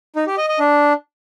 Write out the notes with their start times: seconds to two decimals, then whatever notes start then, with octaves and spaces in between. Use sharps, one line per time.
0.16 D#4
0.27 G4
0.38 D#5
0.49 D#5
0.59 D4